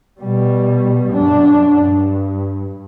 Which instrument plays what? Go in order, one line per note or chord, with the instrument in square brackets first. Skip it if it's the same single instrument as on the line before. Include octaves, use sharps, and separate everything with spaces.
[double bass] B2 G3
F#2 D4
G2